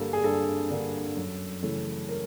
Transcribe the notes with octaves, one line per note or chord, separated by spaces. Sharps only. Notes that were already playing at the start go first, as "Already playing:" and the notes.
Already playing: G2 D3 G3 A#3 A4
G#4
G2 A4
D3 G3 A#3
F#2
C#3 E3 A3
A#4